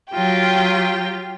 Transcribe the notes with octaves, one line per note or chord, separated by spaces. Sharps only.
F#3 F4 G4 G5